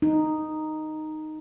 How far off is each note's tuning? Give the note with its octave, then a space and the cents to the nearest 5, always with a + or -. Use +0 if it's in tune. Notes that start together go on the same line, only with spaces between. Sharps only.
D#4 -5